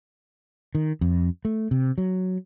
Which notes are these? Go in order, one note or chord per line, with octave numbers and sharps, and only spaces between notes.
D#3
F2
A3
C3
F#3